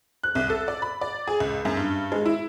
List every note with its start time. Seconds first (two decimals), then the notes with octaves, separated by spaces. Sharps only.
0.23 F#6
0.35 C2
0.50 A4
0.68 D5
0.82 B5
1.01 D5
1.27 G#4
1.40 C#2
1.65 F#2
1.77 G2
2.12 G#3
2.26 E4